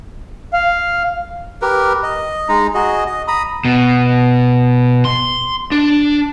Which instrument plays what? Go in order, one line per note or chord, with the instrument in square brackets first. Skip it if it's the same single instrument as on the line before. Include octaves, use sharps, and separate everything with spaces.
[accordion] F5
[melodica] G4 A#4 B4
D#5
G#3 D#4 A#5
F#4 G#4 D#5
D#5
A#5 B5 D#6
[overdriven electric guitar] B2
C6
D4